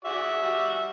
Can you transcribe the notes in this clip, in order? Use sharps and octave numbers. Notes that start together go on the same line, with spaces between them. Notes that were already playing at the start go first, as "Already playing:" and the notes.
F#4 G#4 D5 E5
G3 F#4